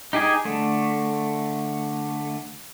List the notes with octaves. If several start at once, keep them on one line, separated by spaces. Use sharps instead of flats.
D#4 G4 G#4 G#5 D#6
D3 A3